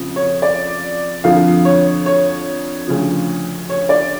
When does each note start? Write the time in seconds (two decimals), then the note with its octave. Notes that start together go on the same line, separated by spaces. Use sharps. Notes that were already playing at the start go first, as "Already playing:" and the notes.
Already playing: F2 C#3 F3
0.16 C#5
0.42 D5
1.24 F2 D3 F3 F5
1.65 C#5
2.06 C#5
2.88 D2 C#3 F3
3.69 C#5
3.89 D5